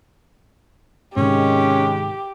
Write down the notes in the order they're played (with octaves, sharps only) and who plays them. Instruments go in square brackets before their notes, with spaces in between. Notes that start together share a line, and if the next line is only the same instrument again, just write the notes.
[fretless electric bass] G#2 C3 [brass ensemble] D#3 G#3 [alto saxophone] C#4 [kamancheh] G4